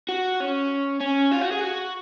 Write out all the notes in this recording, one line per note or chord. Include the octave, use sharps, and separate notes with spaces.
F#4
C#4
C#4
F4
F#4
G#4
F#4